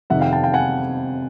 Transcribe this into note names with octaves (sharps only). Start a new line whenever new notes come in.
F2 C3 D#3 E5 F#5
F5 G5
G5 A5
F5 G5
F#5 G#5